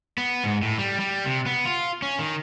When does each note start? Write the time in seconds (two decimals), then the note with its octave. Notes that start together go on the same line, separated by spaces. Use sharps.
0.18 B3
0.44 G#2
0.62 A2
0.78 G3
1.00 G3
1.25 C3
1.46 B3
1.65 F4
2.02 C#4
2.19 D#3